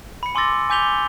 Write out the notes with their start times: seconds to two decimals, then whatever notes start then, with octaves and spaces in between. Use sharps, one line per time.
0.23 B5 C#7
0.35 G#5 C6 D6 E6 A6 A#6
0.70 G#5 D6 G6 B6 F7 G7